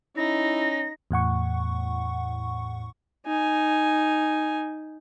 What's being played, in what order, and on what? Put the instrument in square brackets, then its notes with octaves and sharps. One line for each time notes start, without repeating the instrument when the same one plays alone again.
[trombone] C#4 [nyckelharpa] D#4 [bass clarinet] E4 [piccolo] A#6
[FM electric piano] E2 A2 F#5 C#6
[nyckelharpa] D#4 G#5